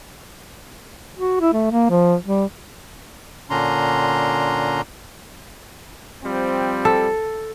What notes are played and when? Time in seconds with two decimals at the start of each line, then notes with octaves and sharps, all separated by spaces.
1.18 F#4
1.40 E4
1.53 A3
1.71 A#3
1.90 F3
2.26 G3
3.50 A#2 D3 C#4 D4 A#5 C6
6.23 F3 G3 C4
6.85 A4